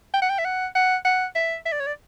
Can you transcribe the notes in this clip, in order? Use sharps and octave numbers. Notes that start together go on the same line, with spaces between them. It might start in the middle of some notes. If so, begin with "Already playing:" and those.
G5
F#5
G5
E5
F#5
F#5
F#5
E5
E5
D5
C#5
D5